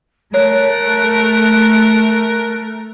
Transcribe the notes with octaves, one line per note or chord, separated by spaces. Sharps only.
A3 A#4 C#5 F#6